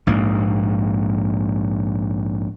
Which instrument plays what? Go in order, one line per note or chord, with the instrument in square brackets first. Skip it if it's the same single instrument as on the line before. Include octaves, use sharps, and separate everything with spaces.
[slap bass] A#1 G#2 A#3